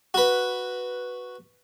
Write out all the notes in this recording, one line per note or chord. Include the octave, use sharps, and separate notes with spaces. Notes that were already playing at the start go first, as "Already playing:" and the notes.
F#4 B4